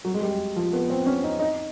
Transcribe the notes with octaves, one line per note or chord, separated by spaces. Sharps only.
F#3
G#3
G3
F3
B3
C4
C#4
D#4
D#4